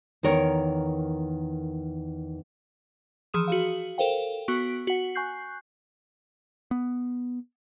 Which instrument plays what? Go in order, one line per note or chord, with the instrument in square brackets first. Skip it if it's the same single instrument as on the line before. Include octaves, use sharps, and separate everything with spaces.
[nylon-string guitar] E2 D#3 A#4 C#5
[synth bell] E3 F3 G#4 D#6 E7
F#4 G#4 F5
A4 A#4 C5 F5 G5
B3 F#4 C#6 D7
F#4 F#5
G#5 C#6 F#6 G6 C7
[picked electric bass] B3